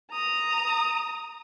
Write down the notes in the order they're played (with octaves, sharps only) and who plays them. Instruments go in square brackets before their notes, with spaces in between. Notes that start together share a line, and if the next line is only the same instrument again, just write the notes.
[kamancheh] A#5 D#6